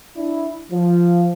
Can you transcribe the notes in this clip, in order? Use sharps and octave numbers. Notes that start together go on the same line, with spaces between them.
D4 E4
F3